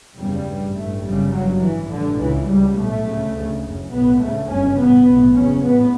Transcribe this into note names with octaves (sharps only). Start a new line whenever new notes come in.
F#1 E2 C#3 G3
A1 G2
A1 G2 A3
G1 F#2 C#3 G3
G1 G2 F#3
A1 G2 E3
A1 G2 D3
C#2 C#3 E3
C#2 C#3 G3
B1 A2 A3
D2 C#3
D2 C#3
F#1 F#2 C#3
B1 A2 B3
D2 C#3 A3
G1 F#2 C#3 C#4
A1 G2 B3
B1 A2
F#1 E2 C#3 C#4
A1 A2 B3